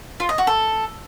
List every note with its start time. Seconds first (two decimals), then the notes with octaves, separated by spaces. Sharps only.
0.20 F4
0.29 D#5
0.38 F#4
0.47 A4